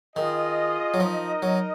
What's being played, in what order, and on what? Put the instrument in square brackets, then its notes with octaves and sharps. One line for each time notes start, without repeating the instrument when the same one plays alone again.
[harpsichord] D#3 [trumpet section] F4 G#4 D#5
[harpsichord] F#3
[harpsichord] F3 [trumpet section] D#4 A#4 D#5
[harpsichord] F#3